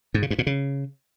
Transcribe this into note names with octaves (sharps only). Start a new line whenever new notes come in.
G#2
C#3
G2
A#2
C#3